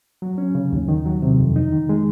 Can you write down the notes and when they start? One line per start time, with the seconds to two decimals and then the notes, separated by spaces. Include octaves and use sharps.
0.22 F#3
0.38 C#4
0.55 C#3
0.73 D#2
0.88 D#3
1.05 F#3
1.22 C3
1.39 F2
1.56 D#4
1.72 D#3
1.89 G#3